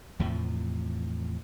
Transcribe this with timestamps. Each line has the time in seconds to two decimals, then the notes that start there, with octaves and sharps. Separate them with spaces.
0.19 E2 A2 C3 F3